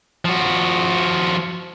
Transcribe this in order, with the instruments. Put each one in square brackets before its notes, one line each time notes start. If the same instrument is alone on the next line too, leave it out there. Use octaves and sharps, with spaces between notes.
[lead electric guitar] F3 F#4